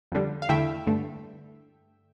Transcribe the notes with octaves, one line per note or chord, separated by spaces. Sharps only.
F2 D3 G3
F5
E2 D3 A3 E4 E5 G5
G2 D3 A3